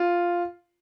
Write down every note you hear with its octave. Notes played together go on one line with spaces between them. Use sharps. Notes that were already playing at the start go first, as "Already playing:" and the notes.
Already playing: F4